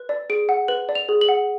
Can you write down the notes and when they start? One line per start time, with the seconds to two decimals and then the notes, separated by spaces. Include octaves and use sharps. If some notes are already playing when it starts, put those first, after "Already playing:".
Already playing: B4
0.09 D5
0.30 G#4 D7
0.49 F#5
0.68 B4 F#7
0.89 D5
0.95 F7
1.09 G#4
1.21 F#7
1.29 F#5